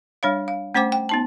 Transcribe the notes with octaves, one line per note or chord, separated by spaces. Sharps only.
G3 D4 C#5 F5
F5
A3 C#4 C5 G5 D6
G5
B3 D#4 A5